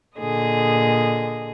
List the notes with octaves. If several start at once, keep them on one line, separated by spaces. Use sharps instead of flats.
A#2 D3 G#4 D#5